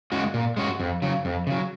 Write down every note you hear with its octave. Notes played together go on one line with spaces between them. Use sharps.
G#3 C#4 F#4
A#2
G#3 C#4 F#4
F2
C#3 F#3
F2
C#3 F#3